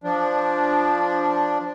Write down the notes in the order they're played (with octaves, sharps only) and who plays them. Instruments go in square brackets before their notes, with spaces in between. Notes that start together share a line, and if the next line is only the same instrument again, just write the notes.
[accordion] F3 D4